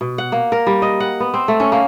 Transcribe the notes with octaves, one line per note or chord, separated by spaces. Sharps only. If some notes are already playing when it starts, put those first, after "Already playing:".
B2
F#5
A#3
A#4
G3
D#5
F#5
B3
C4
A3
C#4
A#3